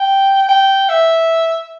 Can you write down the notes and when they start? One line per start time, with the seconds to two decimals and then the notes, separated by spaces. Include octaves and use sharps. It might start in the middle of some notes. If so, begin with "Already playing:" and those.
Already playing: G5
0.49 G5
0.89 E5